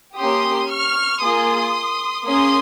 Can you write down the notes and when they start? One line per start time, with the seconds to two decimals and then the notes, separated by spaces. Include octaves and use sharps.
0.16 A#3 C#4 G4 C6 D#6
0.69 C#6 F6
1.21 A#3 F4 G#4 C6 D#6
2.25 A#3 C#4 G#4 C6 D#6